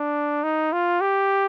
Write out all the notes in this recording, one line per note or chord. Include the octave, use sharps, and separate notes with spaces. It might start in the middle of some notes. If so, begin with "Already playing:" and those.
Already playing: D4
D#4
F4
G4